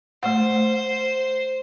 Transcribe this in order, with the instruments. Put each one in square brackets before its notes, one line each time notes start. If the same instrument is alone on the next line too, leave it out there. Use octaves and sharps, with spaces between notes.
[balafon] A3 F#5 [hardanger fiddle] C5